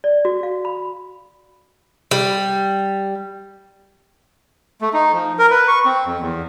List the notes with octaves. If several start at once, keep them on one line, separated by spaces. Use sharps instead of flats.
D5
F#4
F5
B5
G3
A3
D#4
F3
A#4
B4
C#6
C4
F2
E2